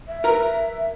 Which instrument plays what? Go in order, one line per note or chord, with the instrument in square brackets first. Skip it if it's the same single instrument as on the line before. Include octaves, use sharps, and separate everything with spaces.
[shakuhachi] E5
[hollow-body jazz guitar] A#4 B4 A#5